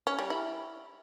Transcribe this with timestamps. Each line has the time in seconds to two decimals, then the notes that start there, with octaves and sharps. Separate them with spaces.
0.07 C#4
0.19 G3
0.30 E4